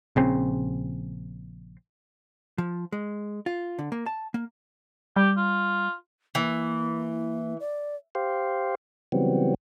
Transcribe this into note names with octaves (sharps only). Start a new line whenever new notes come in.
A#1 C#3 C4
F3
G#3
F4
D3
A#3
A5
A#3
G3 G4
F4
E3 A#3
D5
G4 C5 F5
C#3 E3 F#3 G3 B3 C4